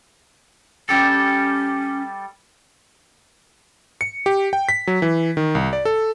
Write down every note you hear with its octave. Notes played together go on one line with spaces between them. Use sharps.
G3 C#4 G4 A4
C#7
G4
G5
B6
F#3
E3
D#3
C2
D5
A4